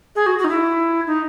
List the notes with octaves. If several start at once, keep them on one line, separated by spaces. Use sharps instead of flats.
G#4
F#4
F#4
D#4
E4
D#4